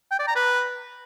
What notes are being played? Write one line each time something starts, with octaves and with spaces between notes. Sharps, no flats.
G5
D5
A#5
B4